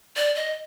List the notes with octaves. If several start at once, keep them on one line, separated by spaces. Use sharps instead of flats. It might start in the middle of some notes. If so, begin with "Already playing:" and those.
D5
D#5